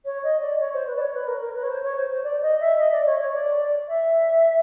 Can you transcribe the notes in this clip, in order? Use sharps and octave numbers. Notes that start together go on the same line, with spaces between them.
C#5
D#5
D5
C#5
C5
B4
D5
C#5
B4
A#4
A#4
B4
C#5
C5
C#5
C5
C5
D5
D#5
E5
D#5
D5
C#5
C#5
D5
E5